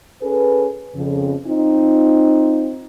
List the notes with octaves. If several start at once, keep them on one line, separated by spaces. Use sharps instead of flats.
C#4 G#4 A4 B4
F2 C#3
C4 D#4 F4